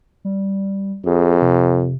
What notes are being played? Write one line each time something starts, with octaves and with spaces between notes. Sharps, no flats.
G3
F2 G#4
C3